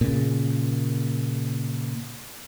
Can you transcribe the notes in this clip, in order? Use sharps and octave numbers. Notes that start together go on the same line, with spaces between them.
A#2 C#3